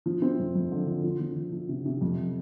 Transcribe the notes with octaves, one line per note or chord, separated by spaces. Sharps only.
F3
C4
F2
F2
D3
F3
F3
F3
F3
F3
C3
C3
F2